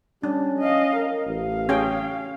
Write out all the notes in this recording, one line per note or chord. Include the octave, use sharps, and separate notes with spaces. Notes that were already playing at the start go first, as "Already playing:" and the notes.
G3 C#4 D4
D#5 F5
A#4
A1 F5
C#4 G#4 G5